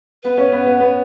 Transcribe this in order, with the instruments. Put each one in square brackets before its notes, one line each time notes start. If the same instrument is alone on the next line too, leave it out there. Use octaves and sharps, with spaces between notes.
[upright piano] B3 [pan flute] B4
[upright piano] C#4
B3
B3
B3